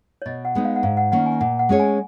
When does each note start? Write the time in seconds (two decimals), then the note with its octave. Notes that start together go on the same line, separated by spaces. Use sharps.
0.22 C#5
0.26 B2 D#5
0.45 F#5
0.55 G#3 B3 D#4
0.65 F5
0.76 F#5
0.83 G#2 F5
0.97 F#5
1.12 D#3 A#3 C#4 F#5
1.26 G#5
1.41 A#2 F#5
1.59 F#5
1.69 G#3 C#4 G#4 C#5
1.79 G#5